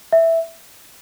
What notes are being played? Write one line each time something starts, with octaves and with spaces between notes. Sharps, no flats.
E5